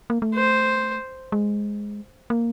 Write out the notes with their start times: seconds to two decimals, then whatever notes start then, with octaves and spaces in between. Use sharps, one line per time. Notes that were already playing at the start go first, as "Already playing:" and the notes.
0.10 A#3
0.22 A3
0.34 C5
1.32 G#3
2.30 A#3